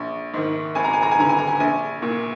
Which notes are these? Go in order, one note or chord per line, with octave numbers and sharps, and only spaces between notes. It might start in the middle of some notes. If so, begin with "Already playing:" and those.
Already playing: A#1
G#2 D#3
G#1 G#5
A#5
G#5
A#5
G#5
G2 D3 A#5
G#5
A#5
G#5
A#1 G#5
A#2